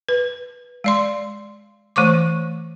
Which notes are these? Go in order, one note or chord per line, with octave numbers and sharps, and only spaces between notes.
B4
G#3 D5 C6
E3 A3 C5 C#6 D6